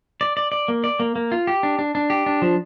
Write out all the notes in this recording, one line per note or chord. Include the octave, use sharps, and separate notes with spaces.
D5
D5
D5
A#3
D5
A#3
A#3
F4
G4
D4
D4
D4
G4
D4
F3